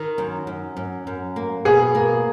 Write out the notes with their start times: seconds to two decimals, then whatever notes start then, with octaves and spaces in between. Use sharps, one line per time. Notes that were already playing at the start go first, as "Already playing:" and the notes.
Already playing: D#3
0.18 F#2
0.47 F#2
0.77 F#2
1.07 F#2
1.36 A#3
1.65 B2 G#4
1.95 A#3